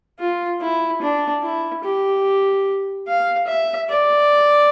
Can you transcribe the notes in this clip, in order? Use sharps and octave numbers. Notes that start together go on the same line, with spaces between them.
F4
E4
D4
E4
G4
F5
E5
D5